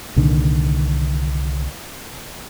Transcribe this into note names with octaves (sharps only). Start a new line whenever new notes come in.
C2 A#2 D3 D#3